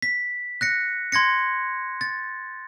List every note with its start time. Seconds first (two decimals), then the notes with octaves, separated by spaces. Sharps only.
0.02 B6
0.61 F#6 A#6 C#7
1.12 C6 G#6 A#6 C#7
2.01 A6